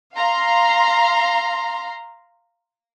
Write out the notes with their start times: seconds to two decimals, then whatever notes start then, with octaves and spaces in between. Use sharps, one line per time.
0.17 F5 A#5 C6